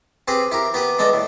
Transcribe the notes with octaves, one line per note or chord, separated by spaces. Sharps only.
C4 G4 G#4 B4
E4 G4 A#4
B3 G4 B4
G#3 B3 A4 D5 D#5
A2